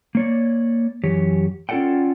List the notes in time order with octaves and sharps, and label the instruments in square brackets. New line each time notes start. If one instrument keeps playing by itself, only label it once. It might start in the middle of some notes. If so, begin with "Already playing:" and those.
[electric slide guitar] A#3 C#5 D5
F#2 E3 G4 C#5
C#4 F4 A4 D5 F#5 G5